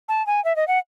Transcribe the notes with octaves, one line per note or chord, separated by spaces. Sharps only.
A5
G#5
E5
D#5
F#5